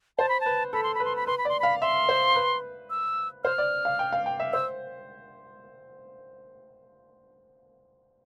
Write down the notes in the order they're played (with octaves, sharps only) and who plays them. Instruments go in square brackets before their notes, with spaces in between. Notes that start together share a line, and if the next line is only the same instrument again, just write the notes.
[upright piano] C5 [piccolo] A5
[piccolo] B5
A5
[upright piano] B4
[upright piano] A4 [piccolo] B5
[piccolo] C6
B5
[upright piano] B4
[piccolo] C6
B5
[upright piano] B4 [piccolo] C6
[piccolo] B5
[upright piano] D5
[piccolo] C6
[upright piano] F5 [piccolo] B5
[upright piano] E5 [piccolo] C6
[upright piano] C5
B4
[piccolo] E6
[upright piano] C5 [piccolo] F6
[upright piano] D5
F5
G5
F5
G5
E5
[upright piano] C5 [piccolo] E6